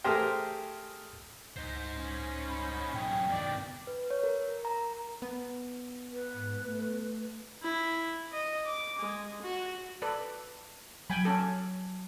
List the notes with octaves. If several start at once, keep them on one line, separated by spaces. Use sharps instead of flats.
A3 G4 G#4 A#4 C5 G5
C#2 D#4 C5
C#4
B5
B1 G#4 G5
G2 B2 D#3 D5
B4
C#5
A#4
A#4
A#5
B3
B4
G#2
A3
E4
D#5
D6
G#3
F#4
A4 B4 D5
F#3 G5 G#5 B5
C#4 A4